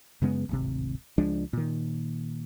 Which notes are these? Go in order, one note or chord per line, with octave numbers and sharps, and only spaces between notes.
F#2 C#3 G#3 B3
D1 G#1 C3
C#2 F3 G#3 D4
A#2 D#3